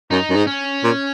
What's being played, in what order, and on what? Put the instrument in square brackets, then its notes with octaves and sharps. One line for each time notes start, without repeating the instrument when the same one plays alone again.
[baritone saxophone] F#2 [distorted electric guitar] D#4
[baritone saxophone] F#2
G#2
[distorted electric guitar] C#4
[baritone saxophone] A#2